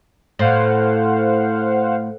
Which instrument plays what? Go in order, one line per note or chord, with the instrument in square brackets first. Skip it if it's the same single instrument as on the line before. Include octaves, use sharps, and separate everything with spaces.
[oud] A2 [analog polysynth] C5 F5 F#5